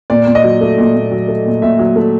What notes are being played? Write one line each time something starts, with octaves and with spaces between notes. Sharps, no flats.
A#2 D5
A#2
D#5
F#3
A3
A#2
A#2
F#3
A3
A#2
A#2 E5
F#3
A3